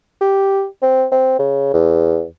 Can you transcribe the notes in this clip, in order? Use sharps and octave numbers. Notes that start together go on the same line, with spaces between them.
G4
C4
C4
C#3
E2